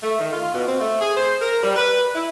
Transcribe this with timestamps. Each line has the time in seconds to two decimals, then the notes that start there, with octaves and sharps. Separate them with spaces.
0.03 A3
0.20 D#3
0.32 F4
0.54 B2
0.67 C4
0.81 A3
1.01 G#4
1.17 C5
1.41 A#4
1.63 G3
1.76 B4
2.14 E4